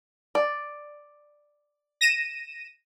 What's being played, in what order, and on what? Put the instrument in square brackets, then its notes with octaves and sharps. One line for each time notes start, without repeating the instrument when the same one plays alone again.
[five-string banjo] D5
[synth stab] A#6 D#7 E7